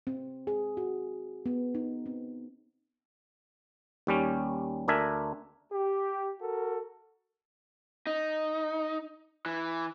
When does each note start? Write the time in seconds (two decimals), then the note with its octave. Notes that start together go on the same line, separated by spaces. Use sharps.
0.07 C4
0.47 G#4
0.77 F#4
1.46 B3
1.75 D#4
2.06 C4
4.07 D#2 G3 C#4
4.88 D2 D4 A#4 E5 G#5
5.72 G4
6.41 F#4 A4 A#4
8.07 D#4
9.46 E3